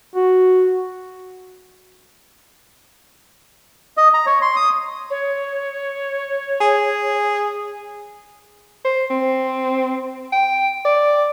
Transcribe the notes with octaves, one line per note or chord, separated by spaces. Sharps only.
F#4
D#5
A#5
C#5
C6
D#6
C#5
G#4
C5
C4
G5
D5